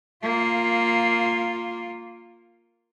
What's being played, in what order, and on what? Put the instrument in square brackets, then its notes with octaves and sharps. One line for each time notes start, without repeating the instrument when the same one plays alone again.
[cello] A#3 F4